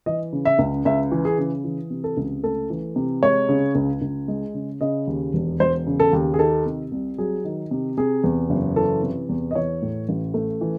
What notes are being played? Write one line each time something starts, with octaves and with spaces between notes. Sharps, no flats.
E3 D#5
C#3
E5
C#2
C#2 E5
E3
G#4
C#3
E3
C3
A4
C#2
A3 A4
E3
C3
G#3 C#5
C#3
C#2
C#2
G#3
C#3
C#3 D#5
D#2
E1
E1 C5
C#3
A4
D#2
G#4
D#3 A4
C3
C2
F#3 G#4
D#3
C3
C3 G#4
E2
F#1
E3 A4
C3
E2
D#5
E3 C#5
A2
A1
A3
E3